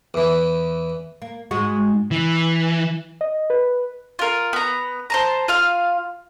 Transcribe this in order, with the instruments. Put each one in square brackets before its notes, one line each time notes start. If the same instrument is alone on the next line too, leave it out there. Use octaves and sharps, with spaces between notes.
[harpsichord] E2 E3
[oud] A#3
G#2 G#3 F#4
[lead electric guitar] E3
[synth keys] D#5
B4
[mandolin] F4 A#4
B3 A#5
C5 A5 A#5
F4 F5 F6